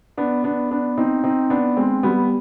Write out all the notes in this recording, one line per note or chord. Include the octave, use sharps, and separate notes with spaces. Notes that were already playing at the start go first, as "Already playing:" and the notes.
B3 D4
B3 D4
B3 D4
C4 D#4
C4 D#4
B3 D4
G#3 C4
G3 B3